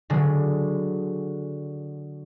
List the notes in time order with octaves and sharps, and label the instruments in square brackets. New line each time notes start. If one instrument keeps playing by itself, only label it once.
[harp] D3 F#3 G#3